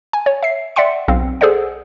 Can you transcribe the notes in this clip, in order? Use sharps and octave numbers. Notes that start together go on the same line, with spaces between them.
G#5
C#5
E5 C7
D5 E5 F#5 G5 C6 C#7
B1 C4 F5
G#4 A4 C5 D5 F#5